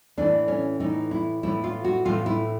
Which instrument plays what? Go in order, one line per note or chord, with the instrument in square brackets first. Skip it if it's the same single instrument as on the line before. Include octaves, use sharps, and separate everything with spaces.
[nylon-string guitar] A2 E3 A3 D4
C#4
A2 E3 A3 D#4
E4
A2 E3 A3 E4
F4
F#4
A2 E3 A3 F4
E4